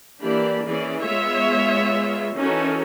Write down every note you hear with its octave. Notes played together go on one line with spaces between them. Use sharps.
E3 A#3 D4 G4 D5 B5
E3 C#4 G#4 D5
G#3 B3 F4 C#5 E5
E3 C#4 D#4 F#4 A4 A#4